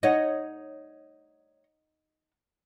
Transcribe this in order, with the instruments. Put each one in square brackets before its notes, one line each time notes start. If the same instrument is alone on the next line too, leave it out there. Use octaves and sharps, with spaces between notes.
[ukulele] D#4 F#5 [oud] C#5 D#5